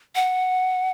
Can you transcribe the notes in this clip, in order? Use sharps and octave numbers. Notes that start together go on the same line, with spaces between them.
F#5